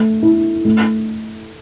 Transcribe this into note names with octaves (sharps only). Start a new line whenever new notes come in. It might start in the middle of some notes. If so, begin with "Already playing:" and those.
Already playing: A3
E4
A3